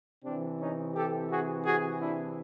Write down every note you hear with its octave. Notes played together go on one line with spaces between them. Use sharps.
C3 E3 C4 D4
C#4 D#4
G4 A4
F#4 G#4
F#4 G#4
D4 E4